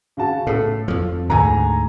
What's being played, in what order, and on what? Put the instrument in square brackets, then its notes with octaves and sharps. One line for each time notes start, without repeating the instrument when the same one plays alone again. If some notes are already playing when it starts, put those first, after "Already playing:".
[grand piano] C#3 F#4 A5
[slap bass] A2 [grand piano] A4
[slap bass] F2 F3
[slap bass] D2 G#2 D3 [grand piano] G#5 A#5